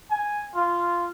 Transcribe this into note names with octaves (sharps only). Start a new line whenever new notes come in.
G#5
F4